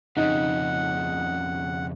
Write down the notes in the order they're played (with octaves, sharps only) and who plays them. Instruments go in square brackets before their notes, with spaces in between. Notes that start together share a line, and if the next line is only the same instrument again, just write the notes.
[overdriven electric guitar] F2 C#3 [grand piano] D#4 [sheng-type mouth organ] F#5